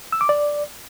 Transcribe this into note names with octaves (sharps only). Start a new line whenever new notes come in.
E6
D6
D5